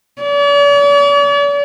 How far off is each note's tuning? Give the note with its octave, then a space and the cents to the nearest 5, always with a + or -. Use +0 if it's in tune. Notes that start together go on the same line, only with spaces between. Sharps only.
D5 -45